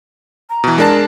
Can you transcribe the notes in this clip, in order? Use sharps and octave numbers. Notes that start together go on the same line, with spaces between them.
A#5
B2 E3
G#3 D4 A#4 A5